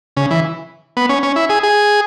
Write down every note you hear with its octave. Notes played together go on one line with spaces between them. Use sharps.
C#3
E3
B3
C#4
C#4
E4
G#4
G#4